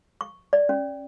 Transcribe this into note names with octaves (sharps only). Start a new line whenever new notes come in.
C#6
D5
C#4